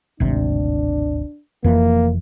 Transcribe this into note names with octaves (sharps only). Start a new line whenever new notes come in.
D1 G#1 C3 D4
F1 F2 E3 A#3